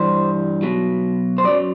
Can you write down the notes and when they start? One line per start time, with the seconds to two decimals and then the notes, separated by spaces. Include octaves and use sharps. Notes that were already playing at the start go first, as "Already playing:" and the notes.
Already playing: G2 E3 G3 C5
0.63 B2 F#3
1.38 C5
1.44 F#2 F#3 D5